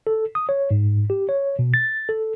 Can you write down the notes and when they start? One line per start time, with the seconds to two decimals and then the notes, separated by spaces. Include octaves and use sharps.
0.07 A4
0.35 D#6
0.49 C#5
0.71 G#2
1.10 G4
1.29 C#5
1.59 B2
1.74 A6
2.09 A4